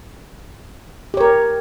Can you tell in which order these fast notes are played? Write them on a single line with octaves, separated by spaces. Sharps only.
G4 C#5 A#4